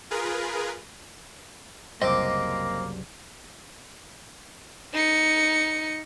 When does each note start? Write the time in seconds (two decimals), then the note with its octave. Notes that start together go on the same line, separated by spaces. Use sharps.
0.11 F4 G#4 A#4 B4
2.02 F#1 C2 A#3 C4 D#5 D6 D7
4.94 D#4 C#7